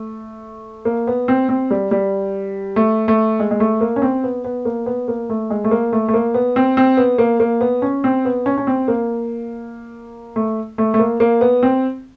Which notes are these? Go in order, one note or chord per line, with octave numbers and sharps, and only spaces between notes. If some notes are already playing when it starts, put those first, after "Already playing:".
Already playing: A3
A#3
B3
C4
C4
G3
G3
A3
A3
G#3
G#3
A3
A#3
C#4
C4
B3
B3
A#3
B3
A#3
A3
G#3
A3
A#3
A3
A3
A#3
B3
C4
C4
B3
A#3
A#3
B3
C#4
C4
B3
C#4
C#4
C4
A#3
A3
A3
A3
A#3
A#3
B3
C4